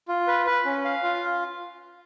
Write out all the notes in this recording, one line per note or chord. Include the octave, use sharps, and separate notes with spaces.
F4
B4
B4
C#4
F5
F4